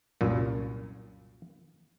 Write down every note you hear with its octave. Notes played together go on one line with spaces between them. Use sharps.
C2 F#2 A#2